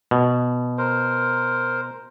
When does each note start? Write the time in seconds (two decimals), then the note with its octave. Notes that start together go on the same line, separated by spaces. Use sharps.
0.11 B2
0.78 A#4 C5